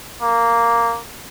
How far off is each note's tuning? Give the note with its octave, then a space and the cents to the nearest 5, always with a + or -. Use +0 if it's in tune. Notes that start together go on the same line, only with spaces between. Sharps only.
A#3 -5